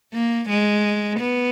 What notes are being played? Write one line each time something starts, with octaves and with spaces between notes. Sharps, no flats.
A#3
G#3
B3